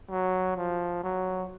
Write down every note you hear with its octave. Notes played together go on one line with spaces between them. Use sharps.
F#3
F3
F#3